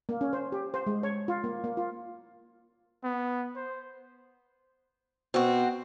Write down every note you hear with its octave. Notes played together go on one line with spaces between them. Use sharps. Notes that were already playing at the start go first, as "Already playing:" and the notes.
A#3
C#4
C5
G4
C5
G#3
C#5
F4
A#3
A#3
F4
B3
C5
B2 C4 F#4